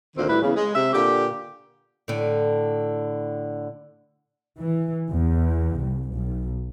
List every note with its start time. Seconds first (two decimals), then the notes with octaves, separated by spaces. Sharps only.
0.16 D2 A#2 D#3 C4
0.28 A2 G3 E4 B4
0.42 E2 C#3
0.56 G#3
0.75 C3 E5
0.93 A#2 D3 G4
2.08 A2 D3
4.60 E3
5.10 E2
5.81 C2
6.13 B1